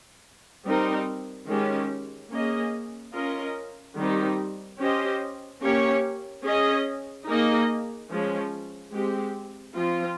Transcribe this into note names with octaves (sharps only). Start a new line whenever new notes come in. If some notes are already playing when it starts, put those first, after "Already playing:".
G3 C4 D#4 A#4
D#3 G#3 C#4 G4
A#3 C#4 G#4 D#5
C#4 F4 A#4 D#5
D#3 G3 C4 D#4 G4
C#4 G4 C5 D#5
A#3 C#4 G4 C#5
C#4 G#4 D#5
A#3 D#4 G#4 D#5
F3 G#3 C#4
G#3 C4 G4
F3 C4 F4